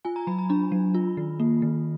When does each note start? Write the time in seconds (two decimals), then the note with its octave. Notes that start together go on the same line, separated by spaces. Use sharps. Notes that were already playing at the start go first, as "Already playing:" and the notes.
0.05 F4 G#5
0.16 A#5
0.27 F#3 B5
0.38 A#5
0.49 D4 B5
0.72 F#3
0.94 F4
1.17 D#3
1.40 A#3
1.62 D#3